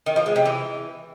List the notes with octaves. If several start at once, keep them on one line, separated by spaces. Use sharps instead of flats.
D#3
F3
G#3
C3
E3